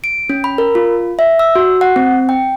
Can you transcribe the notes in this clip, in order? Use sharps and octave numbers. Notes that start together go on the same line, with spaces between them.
D7
C#4
B5
A#4
F4
E5
E6
F#4
F#5
C4
G5